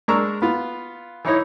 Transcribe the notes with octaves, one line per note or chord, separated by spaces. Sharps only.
G#3 D4 A#4 A#5 C#6 E6
B3 F4
E3 D#4 E4 C#5 D#5